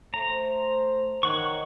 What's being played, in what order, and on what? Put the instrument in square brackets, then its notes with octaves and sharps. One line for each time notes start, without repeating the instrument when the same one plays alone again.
[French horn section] A3 C5 [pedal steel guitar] A#5
[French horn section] D#3 [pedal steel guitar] C#5 F#5 C#6